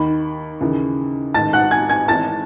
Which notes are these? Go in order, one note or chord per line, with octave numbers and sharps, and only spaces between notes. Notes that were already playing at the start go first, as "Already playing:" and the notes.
Already playing: D#2 D#3 B5
D#2 C#3 E3
A1 G#2 D#3 A5 A6
F#5 F#6
G#5 G#6
G#5 G#6
G#1 G#2 E3 A5 A6